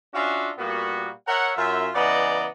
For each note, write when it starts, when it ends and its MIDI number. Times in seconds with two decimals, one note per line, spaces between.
0.14 0.51 61
0.14 0.51 62
0.14 0.51 65
0.14 0.51 66
0.14 0.51 76
0.14 0.51 77
0.58 1.09 46
0.58 1.09 55
0.58 1.09 58
0.58 1.09 59
0.58 1.09 66
1.27 1.51 70
1.27 1.51 73
1.27 1.51 76
1.27 1.51 78
1.57 1.88 42
1.57 1.88 65
1.57 1.88 76
1.94 2.47 49
1.94 2.47 52
1.94 2.47 59
1.94 2.47 74
1.94 2.47 75
1.94 2.47 82